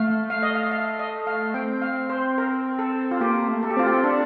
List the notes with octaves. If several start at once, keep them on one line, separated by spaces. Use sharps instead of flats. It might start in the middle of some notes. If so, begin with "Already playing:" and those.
Already playing: A3 F5
F5
D#5
F5
F5
D#5
F5
C4 G5
F5
C5
A#4
A4
F4
A#3 G4
A3
A4
G4
C4 F4
G4
D4 A4